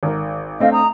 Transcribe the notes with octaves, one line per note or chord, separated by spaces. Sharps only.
G#1 A#4
A3 C4 D4 D#5 F5
A#5 D#6